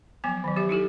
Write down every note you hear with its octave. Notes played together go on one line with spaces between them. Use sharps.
F3 F#3 B3 G#5
D#3 F#3
F3 G4 E5
D#4 E4 G4 A4